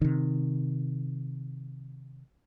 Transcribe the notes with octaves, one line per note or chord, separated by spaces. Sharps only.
C3 D#3